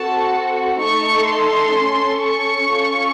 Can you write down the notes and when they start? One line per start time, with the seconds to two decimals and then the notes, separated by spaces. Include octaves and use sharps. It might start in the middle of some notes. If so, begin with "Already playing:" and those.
Already playing: C4 F#4 A4 A5
0.79 A3 D#4 A4 C#6
1.27 C6
1.75 C#4 A4
2.22 C#6
2.70 C#4 F4 A4